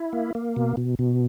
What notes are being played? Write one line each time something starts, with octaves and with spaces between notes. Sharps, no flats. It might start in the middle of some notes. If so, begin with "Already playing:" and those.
Already playing: E4
A#3
A#3
B2
B2
B2